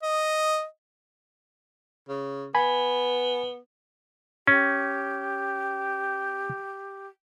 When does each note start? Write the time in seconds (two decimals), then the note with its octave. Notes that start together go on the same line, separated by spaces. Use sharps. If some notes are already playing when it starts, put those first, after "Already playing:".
0.03 D#5
2.09 C#3
2.55 B3 G#5 B5
4.47 C#4 G4